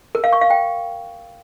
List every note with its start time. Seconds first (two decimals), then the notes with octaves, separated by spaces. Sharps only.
0.15 A#4
0.24 F5
0.33 C#6
0.41 F5
0.50 G5